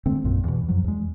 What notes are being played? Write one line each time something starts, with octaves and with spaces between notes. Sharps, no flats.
D3 G#3 A3 C4
A#1 F#2 A#2
E2 B2
F#2 F3 F#3
E2 G#3